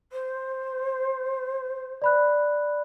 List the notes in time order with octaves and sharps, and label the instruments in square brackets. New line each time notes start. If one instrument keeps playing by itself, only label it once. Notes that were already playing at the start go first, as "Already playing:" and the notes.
[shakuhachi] C5
[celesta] D5 B5 F#6